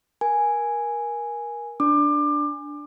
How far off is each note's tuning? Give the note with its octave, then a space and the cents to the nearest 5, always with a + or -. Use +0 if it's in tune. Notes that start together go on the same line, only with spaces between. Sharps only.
A#4 +25 G#5 +0
D4 +0 D6 +25